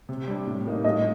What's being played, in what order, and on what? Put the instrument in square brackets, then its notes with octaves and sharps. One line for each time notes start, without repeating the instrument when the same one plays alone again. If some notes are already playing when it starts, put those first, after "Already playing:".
[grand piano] C3
G3 D4
A2
G3 A#3 D#4
[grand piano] A2 [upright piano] D#5